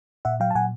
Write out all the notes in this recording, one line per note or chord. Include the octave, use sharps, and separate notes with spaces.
A#2 E5 F#5
F#3 F5 G5
A5
A#2 F#5 G#5